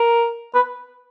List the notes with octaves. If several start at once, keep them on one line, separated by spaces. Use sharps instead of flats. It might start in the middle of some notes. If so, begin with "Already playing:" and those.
Already playing: A#4
B4